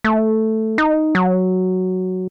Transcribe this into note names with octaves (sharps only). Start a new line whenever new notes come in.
A3
D#4
F#3